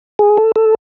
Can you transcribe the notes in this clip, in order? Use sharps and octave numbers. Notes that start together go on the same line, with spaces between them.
G#4
A4
A4